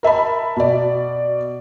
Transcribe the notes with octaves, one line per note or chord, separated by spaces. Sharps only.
A#4 E5 A5 B5
B2 D5